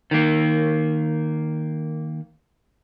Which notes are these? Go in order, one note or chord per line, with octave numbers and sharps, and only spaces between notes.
D#3 A#3